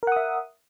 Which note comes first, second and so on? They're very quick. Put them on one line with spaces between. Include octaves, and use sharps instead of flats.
A#4 F#5 D#6 E5